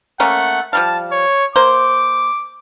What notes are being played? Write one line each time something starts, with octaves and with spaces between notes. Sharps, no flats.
A3 A#3 C#4 F#5
F3 G3 F5 A5
C#5
A#3 C5 D6